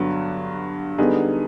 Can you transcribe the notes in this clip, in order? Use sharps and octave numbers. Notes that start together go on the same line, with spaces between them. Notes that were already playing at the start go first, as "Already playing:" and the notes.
Already playing: G2 D3 F#3 B3
D3 G3 B3 D#4 G#4